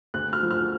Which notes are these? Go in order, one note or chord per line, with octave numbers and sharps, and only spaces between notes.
D2 F#6
F6
F3
F6